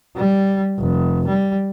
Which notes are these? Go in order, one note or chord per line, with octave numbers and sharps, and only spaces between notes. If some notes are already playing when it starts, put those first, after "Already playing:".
G3
F1
G3